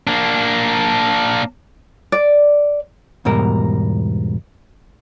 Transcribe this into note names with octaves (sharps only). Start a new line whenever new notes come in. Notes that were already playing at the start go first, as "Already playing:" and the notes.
A#3 D4
D5
E2 G#2 B2 G3 A#4